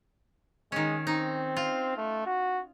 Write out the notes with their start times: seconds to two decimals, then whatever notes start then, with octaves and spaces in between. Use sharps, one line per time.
0.72 D#3 G#3 C#4
1.07 C4 D#4
1.57 F4
1.97 A3
2.26 F#4